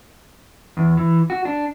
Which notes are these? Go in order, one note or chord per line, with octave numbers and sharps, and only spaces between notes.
E2
E3
F#4
D4